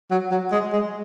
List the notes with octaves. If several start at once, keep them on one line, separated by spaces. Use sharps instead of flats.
F#3
F#3
G#3
G#3